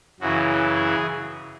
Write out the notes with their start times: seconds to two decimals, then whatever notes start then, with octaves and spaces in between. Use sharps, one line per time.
0.20 F#2 C#3 E3 F#4
0.74 G#4